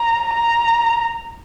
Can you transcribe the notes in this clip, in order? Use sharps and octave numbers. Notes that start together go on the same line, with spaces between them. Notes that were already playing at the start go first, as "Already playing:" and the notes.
Already playing: A#5
A#5